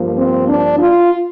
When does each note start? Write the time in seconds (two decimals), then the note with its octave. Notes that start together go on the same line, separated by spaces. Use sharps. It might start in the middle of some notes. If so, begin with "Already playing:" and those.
Already playing: G2 F3 A#3
0.18 C4
0.49 D4
0.79 F4